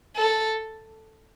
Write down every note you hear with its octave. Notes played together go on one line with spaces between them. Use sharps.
A4